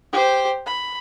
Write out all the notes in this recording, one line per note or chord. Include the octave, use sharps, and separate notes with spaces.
G4 C5
B5